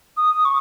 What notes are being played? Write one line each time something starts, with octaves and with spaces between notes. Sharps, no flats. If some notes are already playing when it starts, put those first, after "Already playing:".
D#6
C#6